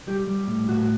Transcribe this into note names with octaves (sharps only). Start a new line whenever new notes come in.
G3 G4
G3
A2
A2 F#4